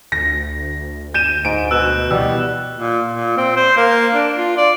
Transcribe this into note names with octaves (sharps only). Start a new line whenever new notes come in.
D2 A#6
G6 D#7 E7
G#2 D7
B2 E6 F#6 E7
B2 E3 G3 E6
A#2
A#2
C4
C5
A#3
D4
F4
D5